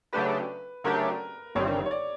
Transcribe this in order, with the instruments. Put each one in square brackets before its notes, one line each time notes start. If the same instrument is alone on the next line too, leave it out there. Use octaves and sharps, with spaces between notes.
[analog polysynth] C#3 F#3 A3 D4 G4 [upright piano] B4
[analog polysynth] C#3 F#3 A3 D4 G4 [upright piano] A#4
[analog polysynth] G1 G2 D#3 G3 C4 [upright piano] C#5
[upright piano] C#5
D5